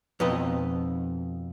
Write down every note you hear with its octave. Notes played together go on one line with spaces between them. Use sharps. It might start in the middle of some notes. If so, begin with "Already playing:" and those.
F2 B2 D#4 B4 D#5